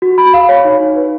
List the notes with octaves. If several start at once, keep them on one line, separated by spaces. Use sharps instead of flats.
F#4
B5
F5
C#5
D#4
D#4
B4